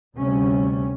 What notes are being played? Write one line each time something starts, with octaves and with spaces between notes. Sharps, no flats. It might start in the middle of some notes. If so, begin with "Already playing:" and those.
D2 C3 G3 C#4